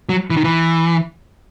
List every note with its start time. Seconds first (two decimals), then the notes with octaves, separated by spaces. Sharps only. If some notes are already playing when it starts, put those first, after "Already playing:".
0.09 F#3
0.30 E3
0.37 D#3
0.44 E3